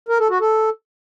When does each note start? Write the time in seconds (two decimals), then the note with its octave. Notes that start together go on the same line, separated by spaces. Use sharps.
0.08 A#4
0.19 A4
0.30 F#4
0.41 A4